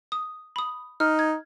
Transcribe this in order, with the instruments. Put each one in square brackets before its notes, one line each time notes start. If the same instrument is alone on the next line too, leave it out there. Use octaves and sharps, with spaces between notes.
[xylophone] D#6
B5 D#6
[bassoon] D#4 [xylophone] F6
[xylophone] G#6